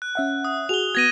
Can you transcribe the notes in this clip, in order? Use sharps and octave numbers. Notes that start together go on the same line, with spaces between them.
F#6
C#4 E5 F#5
D#6
F#4 G#4 F7 G7
B3 F#4 G#6 A#6 D#7